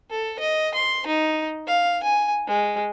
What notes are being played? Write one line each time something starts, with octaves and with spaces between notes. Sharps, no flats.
A4
D#5
C6
D#4
F5
G#5
G#3